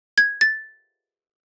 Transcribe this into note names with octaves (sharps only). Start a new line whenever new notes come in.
G#6
A6